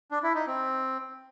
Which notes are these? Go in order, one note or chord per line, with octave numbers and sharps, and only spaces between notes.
D4
E4
D#4
C4